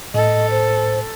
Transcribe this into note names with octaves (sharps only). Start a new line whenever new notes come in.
A2 A4 D#5
C5